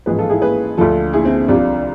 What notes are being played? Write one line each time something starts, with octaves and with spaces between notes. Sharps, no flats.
A1 G#2 F3 G#4 B4
F4 A4
E4 G#4
G#4 B4
D2 D3 F3 F4 A4
E4 G#4
C4 E4
C2 C3 F3 D4 F4